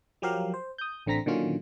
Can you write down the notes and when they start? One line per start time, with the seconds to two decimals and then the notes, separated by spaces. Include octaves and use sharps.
0.22 F3 F#3 G4 A#4 F5
0.54 C5
0.78 D#6 G6
1.06 A1 D3 C4 A#5 A#6 B6
1.26 A#2 D3 D#3 F#3 C#4 F4